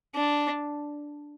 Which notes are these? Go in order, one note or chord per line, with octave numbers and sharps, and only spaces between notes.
D4